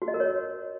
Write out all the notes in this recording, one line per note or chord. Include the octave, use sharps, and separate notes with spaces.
F#4
D#5
A#4
C#5